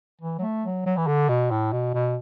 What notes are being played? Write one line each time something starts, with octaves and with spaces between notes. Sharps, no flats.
E3
F#3
A3
F#3
F#3
E3
D3
B2
A2
B2
B2